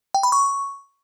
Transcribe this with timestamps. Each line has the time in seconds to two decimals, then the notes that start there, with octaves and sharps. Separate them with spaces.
0.14 G5
0.23 B5
0.32 C#6